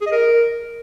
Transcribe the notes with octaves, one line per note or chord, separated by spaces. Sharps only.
G#4
D#5
A#4